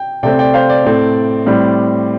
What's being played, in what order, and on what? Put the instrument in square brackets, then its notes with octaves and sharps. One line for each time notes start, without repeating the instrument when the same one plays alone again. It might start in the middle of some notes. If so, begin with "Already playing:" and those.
Already playing: [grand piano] G5
C3 A3 C4 D5 G5
D5 G5
C5 F5
D5
A2 A3 C4
A2 G3 C4